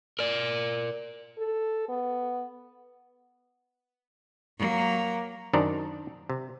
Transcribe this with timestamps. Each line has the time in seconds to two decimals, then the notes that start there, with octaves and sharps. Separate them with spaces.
0.19 A#4 D5
1.38 A4
1.89 B3
4.58 F#3 A#3
5.53 F#2 D#3 D4 C5 D5 A#5
6.30 C3